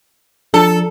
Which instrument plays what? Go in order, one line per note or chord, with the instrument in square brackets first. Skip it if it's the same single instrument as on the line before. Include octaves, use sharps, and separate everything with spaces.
[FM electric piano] F3 D4 [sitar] A4